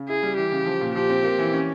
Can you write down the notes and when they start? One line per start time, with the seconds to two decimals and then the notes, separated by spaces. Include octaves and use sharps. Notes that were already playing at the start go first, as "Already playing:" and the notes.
Already playing: C#3
0.08 E4 G#4
0.23 G3
0.37 E3 G4
0.52 C#3
0.66 F3
0.81 A#2
0.95 F3 G4
1.09 C4
1.23 A#3
1.39 E3
1.53 C#4